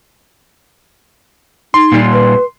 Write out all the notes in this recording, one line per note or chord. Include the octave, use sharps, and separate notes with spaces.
D#4 C6
A#2 G3
B4